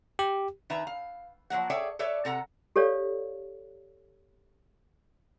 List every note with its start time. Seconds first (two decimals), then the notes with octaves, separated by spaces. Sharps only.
0.19 G4
0.70 D#3 B4 E5 A#5
0.87 F5
1.50 F3 F#3 A#3 F#5
1.70 G#4 A4 C#5 D5 E5 G5
1.99 A4 B4 C#5 D5 E5
2.25 C3 A4 F#5 A#5
2.76 G4 A4 C#5 D5 F5